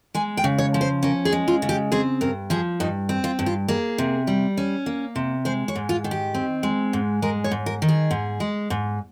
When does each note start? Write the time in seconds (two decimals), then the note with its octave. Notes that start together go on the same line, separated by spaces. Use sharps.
0.15 G#3 G#5
0.37 G5
0.44 C#3
0.58 C#5
0.74 F3
0.81 C5
1.03 C#4 A#4
1.25 G#4
1.32 G#3
1.48 F4
1.62 C#3
1.69 G4
1.92 C4 G#4
2.21 G2 A#4
2.50 F3 G#4
2.80 G2 D#4
3.09 C4
3.24 F4
3.39 G2
3.46 F4
3.68 A#3 G#4
3.98 C3
4.27 G3
4.57 C#4
4.86 A#3
5.16 C3
5.45 G#3 C5
5.68 C#5
5.76 G#2
5.89 F4
6.04 D#3
6.11 G4
6.34 C4
6.63 G#3
6.93 G#2
7.22 G#3 A#4
7.44 C#5
7.51 G#2
7.66 A#4
7.82 D#3
7.88 G#4
8.11 G#2
8.40 G#3
8.70 G#2